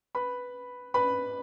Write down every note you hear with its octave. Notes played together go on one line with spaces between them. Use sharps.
B4 B5
B4 B5